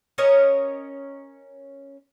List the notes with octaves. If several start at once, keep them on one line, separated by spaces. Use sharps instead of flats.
C#4 A#4 C#5 D#5